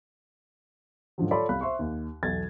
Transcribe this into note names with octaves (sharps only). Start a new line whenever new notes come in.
G#2 D3 F3 F#3
F4 A4 C#5 D5 B5 C6
C2 F5 B5 F#6
C5 E5 C6 C#6
D#2
B1 E2 A4 G#6 A6